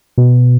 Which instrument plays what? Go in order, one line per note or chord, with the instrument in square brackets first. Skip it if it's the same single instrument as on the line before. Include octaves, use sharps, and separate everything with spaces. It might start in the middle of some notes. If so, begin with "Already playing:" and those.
[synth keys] B2